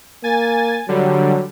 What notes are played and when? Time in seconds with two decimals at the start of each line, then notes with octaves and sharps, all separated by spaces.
0.24 A#3 G#5 A6
0.88 D3 F#3 G3